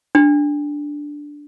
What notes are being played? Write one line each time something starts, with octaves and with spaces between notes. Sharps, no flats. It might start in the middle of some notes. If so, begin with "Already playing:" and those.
D4